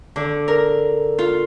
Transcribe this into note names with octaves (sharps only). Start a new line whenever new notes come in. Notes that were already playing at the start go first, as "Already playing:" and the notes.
D3
A#4
F4